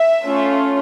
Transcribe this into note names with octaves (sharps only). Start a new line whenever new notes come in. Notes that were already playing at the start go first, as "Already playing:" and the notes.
Already playing: E5
A3 C#4 F4